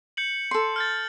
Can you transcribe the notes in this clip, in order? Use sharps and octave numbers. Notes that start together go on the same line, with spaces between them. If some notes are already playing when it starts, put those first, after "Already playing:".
G6 C#7 F#7
A4 C6
F6 G6 A6